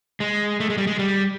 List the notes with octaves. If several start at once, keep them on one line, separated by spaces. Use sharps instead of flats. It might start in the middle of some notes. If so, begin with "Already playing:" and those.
G#3
A3
G#3
G3
G#3
G3